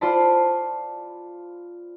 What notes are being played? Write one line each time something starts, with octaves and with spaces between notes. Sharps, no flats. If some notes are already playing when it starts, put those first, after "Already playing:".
F4 C5 D5 A5 B5